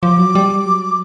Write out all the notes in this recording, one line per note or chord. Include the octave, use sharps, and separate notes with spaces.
F3 D6
F#3
G3
F#3